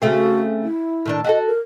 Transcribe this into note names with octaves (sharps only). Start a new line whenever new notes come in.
C#3 A3 C4 F#4
E4
A2 D#3 D4
F#4 G4 A4 D#5
A#4